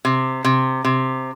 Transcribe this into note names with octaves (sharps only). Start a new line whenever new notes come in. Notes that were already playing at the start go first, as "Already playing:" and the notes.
C3
C3
C3